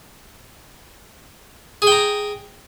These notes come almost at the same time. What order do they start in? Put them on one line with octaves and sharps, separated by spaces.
G#4 G5 A#5